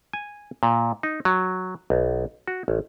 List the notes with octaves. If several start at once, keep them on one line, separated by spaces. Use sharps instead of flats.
G#5
A#2
D#4
F#3
B1
F#4
A1